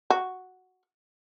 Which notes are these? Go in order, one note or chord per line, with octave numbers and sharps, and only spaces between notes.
F#4